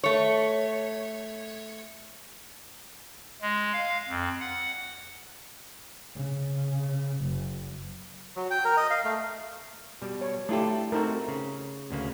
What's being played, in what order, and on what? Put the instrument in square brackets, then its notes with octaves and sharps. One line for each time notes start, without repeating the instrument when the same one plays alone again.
[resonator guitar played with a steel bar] A3 C#5
[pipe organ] G#3
F5
F2
F#5
[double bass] C#3
F#1
[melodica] F#3
G5
A#4
D#5
F5
A3
[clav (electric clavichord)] B2 G3
[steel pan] C#5
[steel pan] A3 E4 G4 [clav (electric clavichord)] D4 F4 A4
[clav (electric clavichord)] A3 C4 F#4 [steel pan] D#4 A4 A#4
[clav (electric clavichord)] C#3
D2 C#3 A#3